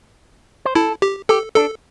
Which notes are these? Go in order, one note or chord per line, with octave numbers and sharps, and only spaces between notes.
C5
E4 A4
G4
G4 A4
D4 A4